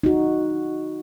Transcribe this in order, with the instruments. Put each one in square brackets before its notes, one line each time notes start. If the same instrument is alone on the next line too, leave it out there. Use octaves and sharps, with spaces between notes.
[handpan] D#4 F#4